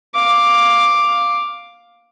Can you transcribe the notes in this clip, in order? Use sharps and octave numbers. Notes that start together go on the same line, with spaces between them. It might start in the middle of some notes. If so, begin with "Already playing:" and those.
F5 D6